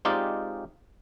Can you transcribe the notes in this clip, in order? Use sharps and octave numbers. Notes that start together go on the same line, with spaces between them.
G#3 C4 D#4 F4 G4 D5